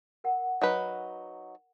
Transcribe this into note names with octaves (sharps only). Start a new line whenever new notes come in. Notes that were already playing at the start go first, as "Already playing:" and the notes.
A#4 F#5
F#3 D#4 B4